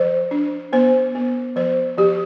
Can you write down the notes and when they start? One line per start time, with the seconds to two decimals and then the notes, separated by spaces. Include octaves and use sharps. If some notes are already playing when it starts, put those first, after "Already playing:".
Already playing: F3 C5
0.31 D4
0.73 B3 C5
1.15 B3
1.56 F3 C5
1.97 F3 G4